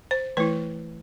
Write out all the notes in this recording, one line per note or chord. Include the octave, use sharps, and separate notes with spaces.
C5
E3 A3 E4 B4